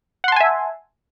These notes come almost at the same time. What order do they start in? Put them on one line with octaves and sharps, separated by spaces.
F#5 C6 A5 G#5 E5